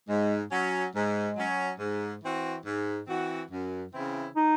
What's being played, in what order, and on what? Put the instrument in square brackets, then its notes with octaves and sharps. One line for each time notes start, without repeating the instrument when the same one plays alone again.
[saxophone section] G#2 [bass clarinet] G#3
[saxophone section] F#3 C#4
[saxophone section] G#2 [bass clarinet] G#3
[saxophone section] F#3 C#4
G#2
E3 C4 F#4
G#2
E3 C4 F#4
F#2
C#3 E3 C4 E4
[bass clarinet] D#4